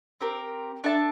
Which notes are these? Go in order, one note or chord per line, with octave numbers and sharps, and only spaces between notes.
C4 G4 A#4
D4 A4 E5 A5